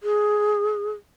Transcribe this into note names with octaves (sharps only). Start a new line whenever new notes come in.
G#4